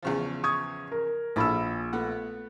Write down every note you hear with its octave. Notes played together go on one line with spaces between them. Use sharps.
E2 C#3 F3
C#6 D#6 G#6
A#4
A#1 E4 G#4 A4 B5 E6
A3 B3 F#5